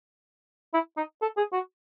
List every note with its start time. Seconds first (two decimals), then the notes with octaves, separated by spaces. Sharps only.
0.74 E4
0.97 D#4
1.22 A4
1.37 G#4
1.53 F#4